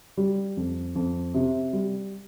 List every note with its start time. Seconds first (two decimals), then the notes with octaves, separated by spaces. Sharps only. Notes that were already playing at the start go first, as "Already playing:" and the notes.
0.17 G3
0.57 F2
0.95 F2
1.34 C3
1.73 G3